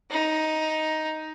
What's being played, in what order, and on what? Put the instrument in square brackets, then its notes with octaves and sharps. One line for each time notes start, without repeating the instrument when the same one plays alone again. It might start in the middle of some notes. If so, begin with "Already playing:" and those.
[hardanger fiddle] D#4